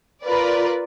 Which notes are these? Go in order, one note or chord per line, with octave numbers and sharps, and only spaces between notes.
F4 A#4 B4 D5